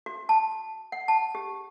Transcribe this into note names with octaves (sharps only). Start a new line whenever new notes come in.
F#4
A5
F#5
A5
G4